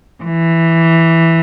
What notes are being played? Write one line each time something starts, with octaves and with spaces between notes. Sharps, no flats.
E3